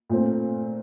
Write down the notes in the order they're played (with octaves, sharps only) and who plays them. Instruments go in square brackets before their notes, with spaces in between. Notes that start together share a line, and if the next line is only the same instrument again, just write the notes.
[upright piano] A#2 A3 C4